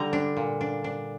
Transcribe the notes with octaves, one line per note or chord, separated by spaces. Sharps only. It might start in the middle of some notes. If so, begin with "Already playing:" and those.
Already playing: D3 G3 A#5
D4
A#2
D4
D4